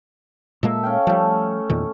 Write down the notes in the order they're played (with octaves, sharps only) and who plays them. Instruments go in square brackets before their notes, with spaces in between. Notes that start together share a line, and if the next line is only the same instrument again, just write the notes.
[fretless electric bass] A#2 G#3 A#3 [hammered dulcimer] A4 E5
[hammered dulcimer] C#4 F5 G5
[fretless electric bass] F3 G3 [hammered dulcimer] A3
[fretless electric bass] E2 A#2 D#3